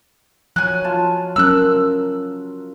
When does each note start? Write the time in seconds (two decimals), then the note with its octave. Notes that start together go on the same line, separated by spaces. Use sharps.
0.56 F3 F#3 G#5 F#6
0.84 F4 A5
1.36 F#3 C#4 A#4 E6 F#6